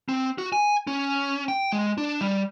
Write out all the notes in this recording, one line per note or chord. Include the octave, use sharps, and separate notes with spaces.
C4
F#4
G#5
C#4
G5
G#3
D4
G3